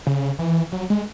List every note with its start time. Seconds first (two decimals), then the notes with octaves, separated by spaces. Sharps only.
0.07 C#3
0.39 E3
0.72 F#3
0.90 G#3